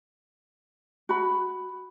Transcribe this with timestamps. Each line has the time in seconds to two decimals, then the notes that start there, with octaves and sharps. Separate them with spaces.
1.09 F#4 B5